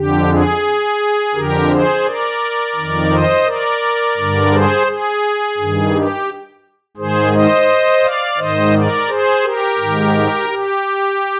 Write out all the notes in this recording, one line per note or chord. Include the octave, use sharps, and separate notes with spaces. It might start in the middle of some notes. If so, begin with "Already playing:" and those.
Already playing: F2 D3 G4
G#4
F2 D3 G4 A#4
G#4 C5
A#4 D5
F2 D#3
C5 D#5
A#4 D5
G2 D3
G#4 C5
G#4
G2 D#3
G4
G#2 D#3 G#4 C5
C5 D#5
D5 F5
G#2 D#3 C5 D#5
A#4 D5
G#4 C5
G4 A#4
G#2 D#3
G4